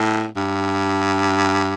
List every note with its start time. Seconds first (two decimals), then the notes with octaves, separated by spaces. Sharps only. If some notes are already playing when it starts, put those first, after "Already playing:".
Already playing: A2
0.36 G2